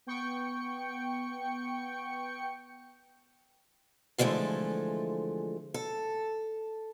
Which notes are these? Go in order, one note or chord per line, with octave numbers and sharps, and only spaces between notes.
B3 G5 C#6 C#7
D3 E3 F3 G#3 A3
A4